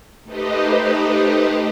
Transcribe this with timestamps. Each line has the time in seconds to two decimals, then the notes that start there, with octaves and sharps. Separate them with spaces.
0.24 A3 D#4 G4 B4 C5 D#5